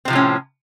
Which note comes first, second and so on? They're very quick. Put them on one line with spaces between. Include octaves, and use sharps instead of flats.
C4 C3 F3 A2 C#4